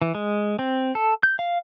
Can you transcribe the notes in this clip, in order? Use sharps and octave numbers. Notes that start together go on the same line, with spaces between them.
E3
G#3
C4
A4
G6
F5